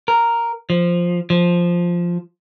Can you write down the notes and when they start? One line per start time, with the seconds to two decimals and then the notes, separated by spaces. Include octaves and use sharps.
0.08 A#4
0.70 F3
1.30 F3